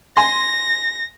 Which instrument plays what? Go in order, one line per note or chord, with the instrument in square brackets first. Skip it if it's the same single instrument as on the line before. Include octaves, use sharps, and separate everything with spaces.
[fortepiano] G#5 C6 [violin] A#6